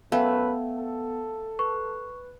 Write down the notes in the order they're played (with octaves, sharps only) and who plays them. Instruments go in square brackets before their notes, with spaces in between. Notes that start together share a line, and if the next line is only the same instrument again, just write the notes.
[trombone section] F#2 B4 [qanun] A3 [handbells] B3 [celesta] F5 G5
[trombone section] A4
[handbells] B4 [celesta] C#6